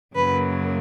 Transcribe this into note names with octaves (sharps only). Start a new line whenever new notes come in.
F#2 C#3 F#3 A#3 B4